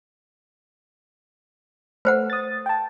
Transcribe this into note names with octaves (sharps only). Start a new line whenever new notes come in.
A3 B4 C5 F#5
D#6 A6
G5 A5